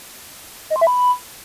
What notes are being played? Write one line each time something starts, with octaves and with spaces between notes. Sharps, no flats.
D#5
C6
E5
B5